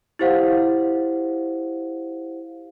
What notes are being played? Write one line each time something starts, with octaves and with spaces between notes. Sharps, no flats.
E4 G4 C5 F5 F#5